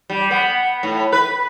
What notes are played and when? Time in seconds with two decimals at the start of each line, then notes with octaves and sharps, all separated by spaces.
0.10 G3
0.31 B3
0.83 A2
1.12 B4